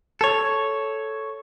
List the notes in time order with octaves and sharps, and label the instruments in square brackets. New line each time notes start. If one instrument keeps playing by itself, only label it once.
[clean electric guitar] A4 C#5